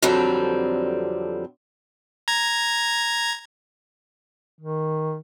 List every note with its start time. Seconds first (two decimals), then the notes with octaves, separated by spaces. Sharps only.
0.02 F2 D3 F#3 G3 C4
2.28 A#5 G#6
4.59 D#3